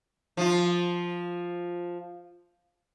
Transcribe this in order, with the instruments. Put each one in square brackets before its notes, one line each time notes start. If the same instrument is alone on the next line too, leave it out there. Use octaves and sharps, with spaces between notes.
[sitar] F3 F4